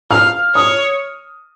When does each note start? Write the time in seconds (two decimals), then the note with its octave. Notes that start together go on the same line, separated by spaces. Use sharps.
0.11 F5 F6
0.55 C#5 D#6